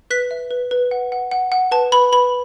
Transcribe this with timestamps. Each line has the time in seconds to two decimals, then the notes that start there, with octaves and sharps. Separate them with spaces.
0.10 B4 F#6 B6
0.31 E5
0.51 B4
0.71 B4
0.91 F#5
1.12 F#5
1.31 F#5
1.52 F#5
1.71 B4 A5
1.92 B4 B5
2.12 B4 B5